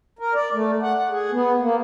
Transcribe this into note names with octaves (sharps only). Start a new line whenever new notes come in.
A#4
D5
A3
F#5
F#5
G#4
B3
A#3